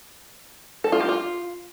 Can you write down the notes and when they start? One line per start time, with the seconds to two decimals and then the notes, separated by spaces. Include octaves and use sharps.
0.84 A4
0.92 F4
1.01 G4
1.09 F4